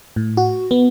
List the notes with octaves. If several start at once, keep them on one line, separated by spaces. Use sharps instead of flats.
A2
F#4
B3